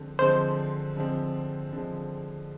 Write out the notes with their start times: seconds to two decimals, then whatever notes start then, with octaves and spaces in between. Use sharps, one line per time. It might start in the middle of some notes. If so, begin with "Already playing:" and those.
Already playing: D3 F3 G#3 C4
0.19 D3 F3 G#3 C4 C5
0.96 D3 F3 G#3 C4
1.73 D3 F3 G#3 C4